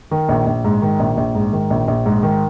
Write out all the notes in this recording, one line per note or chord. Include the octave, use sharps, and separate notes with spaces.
D#3
A#1
A#1
G#2
D#3
A#1
A#1
G#2
D#3
A#1
A#1
G#2
D#3